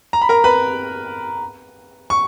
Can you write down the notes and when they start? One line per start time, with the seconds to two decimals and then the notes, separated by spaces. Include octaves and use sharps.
0.13 A#5
0.22 B5
0.29 A#4 A#5
0.44 B4 B5
2.10 C#6